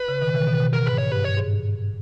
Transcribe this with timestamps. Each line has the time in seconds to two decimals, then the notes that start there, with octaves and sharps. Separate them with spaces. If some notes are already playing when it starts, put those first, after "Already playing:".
Already playing: B4
0.08 C#3
0.21 B2 D#3
0.34 C#3 E3
0.47 B2 D#3
0.60 B2
0.73 A#4
0.85 G#2 B4
0.98 C#5
1.12 G2 B4
1.24 C#5
1.37 G#2